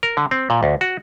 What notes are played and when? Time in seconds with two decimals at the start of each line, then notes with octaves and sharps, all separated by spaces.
0.03 A#4
0.17 D3
0.31 C4
0.50 A#2
0.63 D2
0.81 F#4